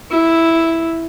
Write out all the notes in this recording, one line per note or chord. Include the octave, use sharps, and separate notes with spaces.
E4